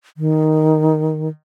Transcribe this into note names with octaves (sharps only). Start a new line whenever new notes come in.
D#3